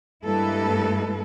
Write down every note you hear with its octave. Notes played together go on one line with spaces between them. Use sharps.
G2 G#3 A#3 E4 A4 B4